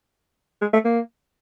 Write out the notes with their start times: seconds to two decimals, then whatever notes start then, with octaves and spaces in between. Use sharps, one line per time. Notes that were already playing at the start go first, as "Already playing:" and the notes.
0.61 G#3
0.73 A3
0.85 A#3